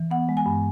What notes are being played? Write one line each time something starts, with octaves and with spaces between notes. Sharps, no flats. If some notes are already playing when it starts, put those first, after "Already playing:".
Already playing: E3
B3 F#5
G#3
G#5
G2